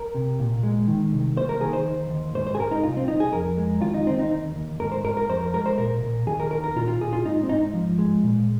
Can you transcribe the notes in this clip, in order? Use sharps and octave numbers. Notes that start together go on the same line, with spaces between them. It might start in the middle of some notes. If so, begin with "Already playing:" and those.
Already playing: A#4
C3
A#2
G#3
D#3
C2
A#3 C5
A#4
D#3 G#4
C5
D#2
D#2
G#2 C5
C5
G#4
G#2 A#4
D#4
C2 F4
C4
C2 D#4
G#4
F2 A#4
G#3
D#2 F4
D#4
D#2 C4
D#4
D#2
D#2
G#2 A#4
C5
G#2 A#4
A#4
F2 C5
A#4
G#3 A#4
C5
A#2 A#4
A#2
D#2 G#4
A#4
D#3 A#4
A#4
A#2 F4
F4
A#2 G#4
F4
G#2 D#4
C4
G#2 D#4
F3
G#3
A#2